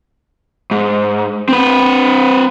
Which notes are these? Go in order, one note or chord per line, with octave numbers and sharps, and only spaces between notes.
G#2
C4 B4